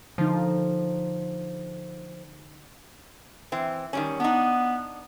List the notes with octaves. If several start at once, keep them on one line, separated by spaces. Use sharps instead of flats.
D3 F3 D#4
E3 C4
D#3 G3 C#4
B3 D4 D#4